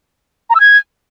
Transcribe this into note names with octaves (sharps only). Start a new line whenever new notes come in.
A#5
E6
G#6